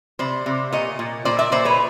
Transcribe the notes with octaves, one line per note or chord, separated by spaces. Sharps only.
C3 C5 D5
C3
A#2 C#5 D#5
A#2
A#2 C5 D5
D5 E5
A#2 C5 D5
B4 C#5